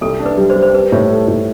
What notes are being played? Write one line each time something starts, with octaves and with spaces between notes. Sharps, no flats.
C2 A4
D4
B4
G3
C5
G3
C5
G3 B4
A2
A4
A2